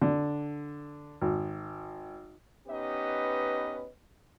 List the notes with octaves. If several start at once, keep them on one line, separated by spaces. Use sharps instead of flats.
D3
G#1
B3 C#4 D#4 G4 B4 D#5